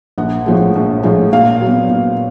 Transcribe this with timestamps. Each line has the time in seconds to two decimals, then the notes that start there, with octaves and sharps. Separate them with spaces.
0.18 A#1 F#5
0.46 A2 F3 G#3
0.75 A#1
1.04 A2 F3 G#3
1.32 A#2 F5
1.61 F#3 B3
1.90 A#2